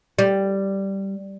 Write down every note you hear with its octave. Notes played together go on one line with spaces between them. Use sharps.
G3